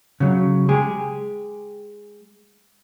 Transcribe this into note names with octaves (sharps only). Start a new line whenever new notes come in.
C#3 F#3
G#3 G4 G#4